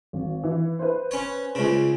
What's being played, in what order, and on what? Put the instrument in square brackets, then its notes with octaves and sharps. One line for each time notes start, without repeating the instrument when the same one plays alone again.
[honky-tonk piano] G#1
E3
B4 C5
[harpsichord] C#4 C#5
C#2 C#3